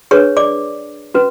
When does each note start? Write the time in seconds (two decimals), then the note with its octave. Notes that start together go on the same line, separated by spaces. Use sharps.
0.11 D4 G#4 B4 C#5 C#6
0.37 D5 D6
1.14 C#4 F#4 B4